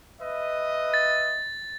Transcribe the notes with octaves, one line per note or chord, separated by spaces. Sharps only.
B4 D#5 E5
A6